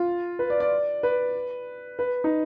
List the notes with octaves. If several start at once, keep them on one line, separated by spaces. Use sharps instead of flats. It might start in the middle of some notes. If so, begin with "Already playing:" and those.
Already playing: F4
B4
D5
D5
B4
B4
D#4